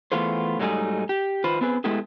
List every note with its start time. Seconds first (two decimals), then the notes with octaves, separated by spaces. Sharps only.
0.12 E3 A3 B3 F4 G#4 C5
0.59 G#2 F#3 G3 A3 D#4 G#4
1.09 G4
1.44 D#3 F4 B4 C5
1.61 B3 C4 G#4 B4
1.84 G#3 A3 B3 E4 G4 G#4